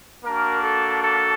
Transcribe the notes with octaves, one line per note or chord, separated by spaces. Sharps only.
A#3 D4 F#4 A#4
A4
A4